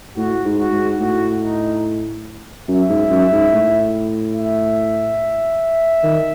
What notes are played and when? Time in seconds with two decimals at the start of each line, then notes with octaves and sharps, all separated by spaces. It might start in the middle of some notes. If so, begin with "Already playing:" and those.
0.17 A2 F#4
0.45 G#2
0.59 F#4
0.73 G#2
1.00 A2 F#4
1.43 D#4
2.68 F#2 E5
2.89 G#2
3.10 F#2
3.32 G#2
3.53 A2
4.36 E5
6.03 D#3